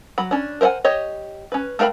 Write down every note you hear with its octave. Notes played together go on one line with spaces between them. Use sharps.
F#3 B5
C#4 D4
A#4 C5 E5 F#5 G#5
G4 C#5 D#5
C#4 B4
A3 A#4 F5 G5 B5